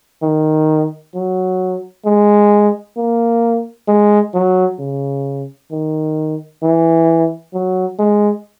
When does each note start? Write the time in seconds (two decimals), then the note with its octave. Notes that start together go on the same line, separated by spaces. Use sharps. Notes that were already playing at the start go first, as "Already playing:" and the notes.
0.22 D#3
1.15 F#3
2.06 G#3
2.97 A#3
3.88 G#3
4.34 F#3
4.79 C#3
5.72 D#3
6.63 E3
7.54 F#3
7.99 G#3